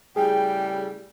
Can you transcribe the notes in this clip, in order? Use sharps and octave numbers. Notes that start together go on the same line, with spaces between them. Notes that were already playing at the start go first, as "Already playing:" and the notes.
A2 C#3 G3 G#4 G5